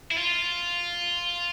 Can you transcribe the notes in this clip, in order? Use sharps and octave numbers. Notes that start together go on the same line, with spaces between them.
E4
F4